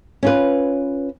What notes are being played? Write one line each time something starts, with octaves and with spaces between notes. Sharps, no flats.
C#4 F4 B4